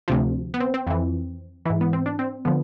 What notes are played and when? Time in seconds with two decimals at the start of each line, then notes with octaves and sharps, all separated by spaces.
0.08 D2 C3 F3
0.54 B3
0.60 C4
0.74 C4
0.87 F2 E3
1.66 G#2 E3 E4
1.81 B3
1.93 C4
2.06 D4
2.19 C4
2.45 D3 F3 B3